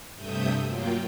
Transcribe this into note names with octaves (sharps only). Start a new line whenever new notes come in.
G2 C3 A3 E5 D#6 G6
F#3 A#3 F4 G5